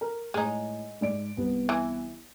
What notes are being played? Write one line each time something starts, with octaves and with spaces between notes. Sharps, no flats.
A#4
A2 G#3 D#4 C#5
G#2 D5 D7
C2 B3
E3